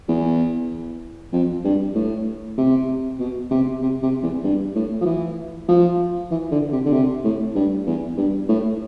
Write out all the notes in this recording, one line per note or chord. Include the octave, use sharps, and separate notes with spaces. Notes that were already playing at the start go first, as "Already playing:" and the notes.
E2
F2
G2
A2
C3
B2
C3
C3
C3
E2
G2
A2
F3
E3
F3
E3
D3
C3
D3
C3
A2
G2
E2
G2
A2